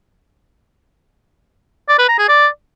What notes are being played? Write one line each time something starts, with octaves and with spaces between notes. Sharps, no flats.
D5
B4
A#5
G#4
D5